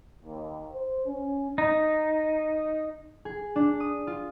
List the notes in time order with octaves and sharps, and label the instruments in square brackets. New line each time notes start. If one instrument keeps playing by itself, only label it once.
[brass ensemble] D#2
C5
C#4
[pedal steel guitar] D#4
[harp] G#4
D4
D#6
F4